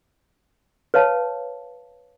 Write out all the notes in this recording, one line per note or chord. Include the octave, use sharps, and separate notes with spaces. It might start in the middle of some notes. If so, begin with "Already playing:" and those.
B4 C#5 F5 A5